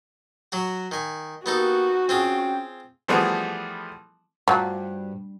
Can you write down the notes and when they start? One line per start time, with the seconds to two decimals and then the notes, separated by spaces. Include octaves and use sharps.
0.52 F#3 F#4
0.92 D#3 G#5
1.46 A#3 B3 D#4 F#4 G4 A4
2.09 C4 C#4 F4 G#4 G5
3.08 E3 F3 G3 A3 B3 G#4
4.48 G2 F3 F#3